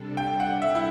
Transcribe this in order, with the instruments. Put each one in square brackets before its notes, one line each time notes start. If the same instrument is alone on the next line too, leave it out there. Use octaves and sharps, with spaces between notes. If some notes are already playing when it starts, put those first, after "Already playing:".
Already playing: [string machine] C3 G3 D4 A4
[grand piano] G5
F#5
E5
E4